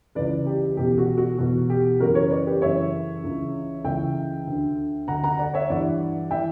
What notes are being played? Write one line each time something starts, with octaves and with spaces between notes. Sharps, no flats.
C#2 C#3 E3 B4 D5
G4
E2 B2 G4
F#4
F#4
E2 B2 F#4
G4
F#2 C#3 E3 F#4 A#4
A#4 C#5
B4 D5
G4 B4
F#2 C#3 E3 C#5 E5
C#2 C#3 E3
C#2 C#3 E3 E5 G5
D2 D3
D2 D3 F#5 A#5
F#5 A#5
D5 F#5
C#5 E5
G2 E3 D5 F#5
E3 E5 G5